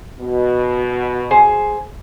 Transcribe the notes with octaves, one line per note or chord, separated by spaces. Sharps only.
B2
G#4 C5